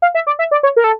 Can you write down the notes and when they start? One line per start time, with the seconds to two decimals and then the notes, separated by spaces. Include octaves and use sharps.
0.02 F5
0.15 E5
0.27 D5
0.39 E5
0.51 D5
0.63 C#5
0.76 A#4
0.84 A4